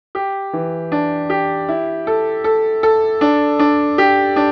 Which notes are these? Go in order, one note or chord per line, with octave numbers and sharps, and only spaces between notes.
G4
E3
D4
G4
E4
A4
A4
A4
D4
D4
G4
D4